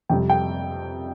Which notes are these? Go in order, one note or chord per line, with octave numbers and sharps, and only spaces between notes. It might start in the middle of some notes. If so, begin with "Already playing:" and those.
F2 C3 G3 G5
G5